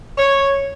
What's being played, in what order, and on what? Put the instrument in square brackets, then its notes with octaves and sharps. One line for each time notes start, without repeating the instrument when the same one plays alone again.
[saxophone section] C#5